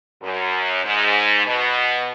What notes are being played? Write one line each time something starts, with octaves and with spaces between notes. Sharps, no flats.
F#2
G#2
B2